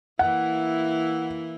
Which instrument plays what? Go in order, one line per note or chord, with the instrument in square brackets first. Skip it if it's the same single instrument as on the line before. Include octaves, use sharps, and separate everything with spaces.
[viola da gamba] E3 A#3 E4 [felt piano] F#5